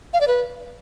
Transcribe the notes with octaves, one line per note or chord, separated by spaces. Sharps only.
F5
D5
B4